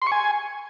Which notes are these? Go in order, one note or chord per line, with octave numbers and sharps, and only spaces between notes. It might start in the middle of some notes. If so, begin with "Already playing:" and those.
C6
C#6
G#5